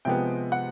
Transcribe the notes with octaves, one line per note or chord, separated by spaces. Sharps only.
C3 F3 G#3 B3 G5
F#5